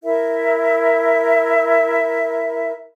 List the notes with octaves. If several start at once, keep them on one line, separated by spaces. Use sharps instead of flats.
E4 A#4 E5